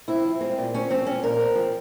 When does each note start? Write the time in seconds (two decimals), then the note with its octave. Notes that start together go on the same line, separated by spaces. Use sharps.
0.08 C4 E4
0.25 F3
0.41 G#3 C4
0.58 A#2
0.74 C4 C#4
0.90 F3 C4
1.07 G#3 C#4
1.23 A#2 A#4
1.39 C4
1.55 F3